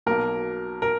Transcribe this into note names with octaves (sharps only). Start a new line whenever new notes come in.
B1 B2 A#3 A#4
A#4